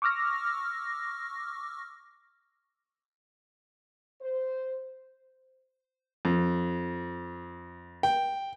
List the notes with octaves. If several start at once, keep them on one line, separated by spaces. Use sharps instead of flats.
C#6 D6 E6 F6 A#6
C5
F2
G5